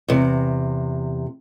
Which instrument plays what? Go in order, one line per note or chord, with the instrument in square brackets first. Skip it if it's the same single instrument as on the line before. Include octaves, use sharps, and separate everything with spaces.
[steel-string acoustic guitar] E2 C3